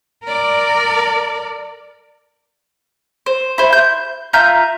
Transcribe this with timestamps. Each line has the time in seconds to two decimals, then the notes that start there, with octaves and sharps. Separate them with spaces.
0.24 A#4 D5
3.26 C5
3.58 E4 C5
3.73 G6
4.33 F4 E5 A#5 G6